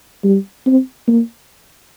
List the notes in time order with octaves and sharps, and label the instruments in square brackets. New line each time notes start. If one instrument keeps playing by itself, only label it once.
[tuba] G3
C4
A#3